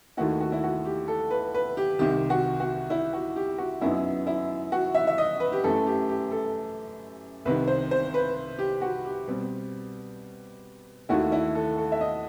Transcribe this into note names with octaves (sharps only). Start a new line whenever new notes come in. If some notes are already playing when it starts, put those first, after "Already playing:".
D#2 D#3 A3 E4 F#4
F#4
E4
F#4
G4
A4
B4
B4
G4
C2 C3 D#3 G4
F#4
F#4
E4
F#4
G4
F#4
F#2 F#3 B3 D#4 E4
E4
F#4
E5
E5
D#5
B4
G4
F#2 E3 A3 A4
G4
G4
A4
C2 C3 D#3 B4
C5
C5
B4
G4
F#4
G4
B2 G3 C4
D#2 D#3 A3 E4 F#4
E4
A4
A4
E5
D#5